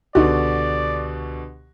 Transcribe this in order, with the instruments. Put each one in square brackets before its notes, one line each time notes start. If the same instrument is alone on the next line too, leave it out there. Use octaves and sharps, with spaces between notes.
[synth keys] C#2 G4 C#6 [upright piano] B2 D3 [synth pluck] D#4 F#4 [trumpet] D5